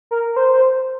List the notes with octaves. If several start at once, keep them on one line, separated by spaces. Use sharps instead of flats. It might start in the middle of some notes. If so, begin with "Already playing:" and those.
A#4
C5
C5